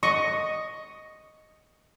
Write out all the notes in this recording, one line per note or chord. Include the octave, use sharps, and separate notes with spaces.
D#5 C#6